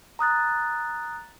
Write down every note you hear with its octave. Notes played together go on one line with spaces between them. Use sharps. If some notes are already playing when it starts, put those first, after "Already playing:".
A#5 D#6 F#6 A6